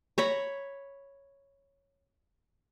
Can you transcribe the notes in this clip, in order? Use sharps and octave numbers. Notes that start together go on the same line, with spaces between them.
C#5 A#5 B5